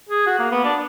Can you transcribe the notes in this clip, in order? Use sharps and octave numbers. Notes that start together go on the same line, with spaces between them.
G#4
F#4
A#3
B3
D4